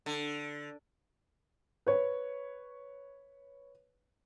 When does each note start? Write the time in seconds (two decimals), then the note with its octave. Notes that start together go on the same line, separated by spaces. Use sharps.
0.06 D3
1.87 B4 C#5